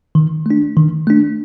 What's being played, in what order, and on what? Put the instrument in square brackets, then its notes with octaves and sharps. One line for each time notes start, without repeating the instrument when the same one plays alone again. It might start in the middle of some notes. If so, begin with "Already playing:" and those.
[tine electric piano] D#3
A3 D4
D#3
A3 D4